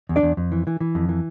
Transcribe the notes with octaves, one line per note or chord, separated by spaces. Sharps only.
E2
D4 D5
E2
F2
E3
E3
E3
F2
E3